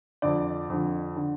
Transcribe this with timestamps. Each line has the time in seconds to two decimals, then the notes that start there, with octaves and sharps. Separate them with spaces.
0.22 F2 D3 D5
0.70 F2 D3
1.16 D3